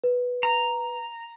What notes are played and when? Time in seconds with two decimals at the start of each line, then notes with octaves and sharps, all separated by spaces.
0.04 B4
0.43 A#5